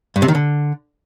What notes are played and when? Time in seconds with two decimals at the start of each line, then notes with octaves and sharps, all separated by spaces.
0.16 G2
0.22 C3
0.28 D#3
0.35 D3